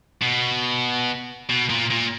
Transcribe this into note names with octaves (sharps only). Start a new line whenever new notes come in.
B2
B2
A#2
A#2